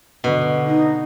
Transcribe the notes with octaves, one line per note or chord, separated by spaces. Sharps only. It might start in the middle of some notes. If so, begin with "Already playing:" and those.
B2 D3
D#4